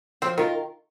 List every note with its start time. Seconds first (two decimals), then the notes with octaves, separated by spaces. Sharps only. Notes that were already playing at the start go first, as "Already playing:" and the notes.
0.22 F3 C4
0.38 D#3 F4 A#4